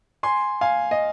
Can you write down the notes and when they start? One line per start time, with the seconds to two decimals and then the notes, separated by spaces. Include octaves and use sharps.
0.23 G#5 C6
0.61 F5 G#5
0.91 D#5